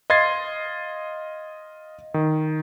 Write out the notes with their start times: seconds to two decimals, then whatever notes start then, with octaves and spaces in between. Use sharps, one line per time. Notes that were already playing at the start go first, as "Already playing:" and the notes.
0.10 D#5 F5 C6 G#6 A6 C7
2.14 D#3